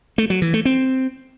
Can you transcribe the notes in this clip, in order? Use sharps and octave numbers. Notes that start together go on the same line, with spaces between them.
A3
F#3
E3
A3
C4